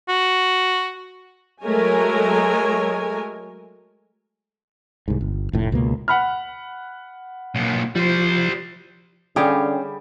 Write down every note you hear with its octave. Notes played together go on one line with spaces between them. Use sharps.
F#4
F#3 G#3 A3 A#4 C#5 G#5
C2 G#2
G1
F1 A2
C#2 B2 A#3
F#5 B5 F6
B1 A#2
F3 G3 C5
D3 G3 C#4 G4 G#4 F5